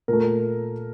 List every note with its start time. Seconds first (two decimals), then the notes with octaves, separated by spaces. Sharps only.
0.08 A#2 A3 A#4